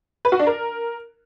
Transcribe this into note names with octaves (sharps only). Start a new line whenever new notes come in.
B4
F#4
D4
A#4